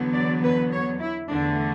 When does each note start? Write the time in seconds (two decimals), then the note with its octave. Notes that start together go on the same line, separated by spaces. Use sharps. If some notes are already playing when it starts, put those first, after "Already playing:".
Already playing: E2 D3 F#3 B3
0.14 D5
0.43 B4
0.72 C#5
1.00 E4
1.29 E2 D3 A3 D4